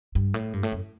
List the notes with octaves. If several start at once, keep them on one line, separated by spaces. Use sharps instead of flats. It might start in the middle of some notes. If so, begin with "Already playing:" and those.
G2
A2
G2
A2
F#2